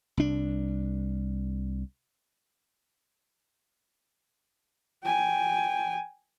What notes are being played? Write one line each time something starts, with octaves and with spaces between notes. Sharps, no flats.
C2 D4
G5 G#5